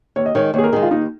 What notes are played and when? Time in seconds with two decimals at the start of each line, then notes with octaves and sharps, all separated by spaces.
0.16 D#2 C#5
0.26 D#5
0.35 D#3 G#3 C#5
0.54 D#2 G#4 C#5
0.64 A#4
0.72 D#3 G#3 G#4
0.82 F4
0.91 D#2 D#4